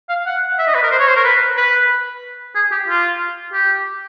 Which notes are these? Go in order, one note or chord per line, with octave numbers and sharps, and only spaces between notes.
F5
F#5
E5
D#5
B4
A#4
C5
C#5
C5
A#4
B4
B4
G#4
G4
F4
G4